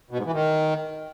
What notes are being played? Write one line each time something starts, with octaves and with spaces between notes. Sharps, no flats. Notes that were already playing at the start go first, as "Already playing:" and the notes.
B2
G#2
E3
D#3